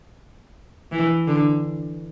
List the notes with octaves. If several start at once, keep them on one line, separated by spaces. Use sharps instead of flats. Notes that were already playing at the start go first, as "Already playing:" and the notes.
E3
D3